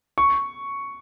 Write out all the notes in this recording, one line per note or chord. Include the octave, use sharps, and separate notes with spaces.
C#6